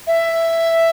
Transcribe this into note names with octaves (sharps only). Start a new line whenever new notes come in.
E5